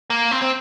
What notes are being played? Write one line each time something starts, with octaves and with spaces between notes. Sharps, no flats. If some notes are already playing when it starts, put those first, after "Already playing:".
A#3
C4
C4